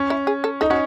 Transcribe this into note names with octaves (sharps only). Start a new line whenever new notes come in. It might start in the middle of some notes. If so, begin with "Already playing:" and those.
Already playing: C#4
E4
G#4
A4
D#4 A4
C#4 F#4